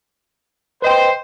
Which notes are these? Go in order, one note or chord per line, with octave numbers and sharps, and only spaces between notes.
B4 C5 D#5 G5